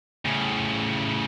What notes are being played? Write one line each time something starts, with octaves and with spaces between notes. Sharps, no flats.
A2 C#3